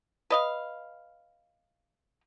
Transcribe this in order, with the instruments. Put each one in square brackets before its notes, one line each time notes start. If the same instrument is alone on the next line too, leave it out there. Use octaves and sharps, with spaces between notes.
[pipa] B4 D#5 F5